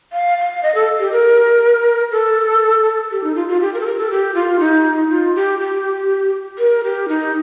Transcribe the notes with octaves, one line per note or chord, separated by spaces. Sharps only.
F5
F5
D#5
A4
G4
A#4
A4
G4
D#4
F4
F4
G4
A#4
A4
A#4
A4
G4
F4
D#4
F4
G4
G4
A#4
G4
D#4